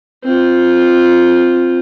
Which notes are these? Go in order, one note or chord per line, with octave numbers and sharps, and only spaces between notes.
C4 F4